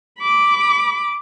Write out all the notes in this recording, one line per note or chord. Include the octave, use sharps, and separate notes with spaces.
B5 D6